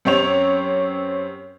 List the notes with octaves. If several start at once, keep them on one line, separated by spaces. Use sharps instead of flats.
F#2 C4 G4 C#5 F7